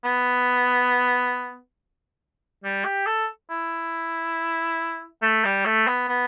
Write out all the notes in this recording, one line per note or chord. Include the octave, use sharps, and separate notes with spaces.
B3
G3
G4
A4
E4
A3
G3
A3
B3
B3